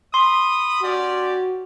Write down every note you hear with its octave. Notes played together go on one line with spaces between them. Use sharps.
B5 C6 D#6
C#4 F#4 G4 D5